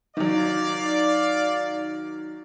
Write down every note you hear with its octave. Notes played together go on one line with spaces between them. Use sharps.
D#3 F#3 D5 F5